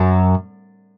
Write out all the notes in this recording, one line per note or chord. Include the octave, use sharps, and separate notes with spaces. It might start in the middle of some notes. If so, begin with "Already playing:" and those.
Already playing: F#2